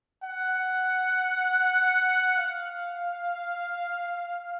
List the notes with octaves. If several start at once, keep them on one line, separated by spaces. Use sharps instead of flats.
F#5
F5